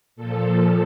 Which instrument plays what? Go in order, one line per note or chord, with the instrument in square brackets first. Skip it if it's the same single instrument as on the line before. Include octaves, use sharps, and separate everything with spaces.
[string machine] A#2 F3 A4